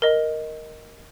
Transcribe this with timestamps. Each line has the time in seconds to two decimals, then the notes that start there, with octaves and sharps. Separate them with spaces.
0.02 A#4 D#5